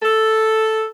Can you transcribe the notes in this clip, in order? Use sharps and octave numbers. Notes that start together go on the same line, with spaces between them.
A4